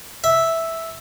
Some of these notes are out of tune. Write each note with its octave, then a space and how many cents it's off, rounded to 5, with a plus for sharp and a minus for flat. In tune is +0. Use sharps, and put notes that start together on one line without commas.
E5 -5